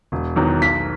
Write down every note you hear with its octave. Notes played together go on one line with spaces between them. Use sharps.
E1
E2 D#3 F#3
B1 B6